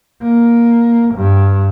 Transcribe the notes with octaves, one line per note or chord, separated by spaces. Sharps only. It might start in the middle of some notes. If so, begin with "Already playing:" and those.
A#3
G2